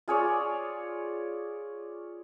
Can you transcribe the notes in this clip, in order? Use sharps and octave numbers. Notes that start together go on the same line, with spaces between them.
F4 G#4 C#5 D5